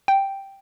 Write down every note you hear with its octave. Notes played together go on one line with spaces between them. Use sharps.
G5